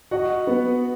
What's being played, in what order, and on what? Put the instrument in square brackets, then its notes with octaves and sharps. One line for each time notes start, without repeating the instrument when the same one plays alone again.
[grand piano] F#4 [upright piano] D#5 F#5
[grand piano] B3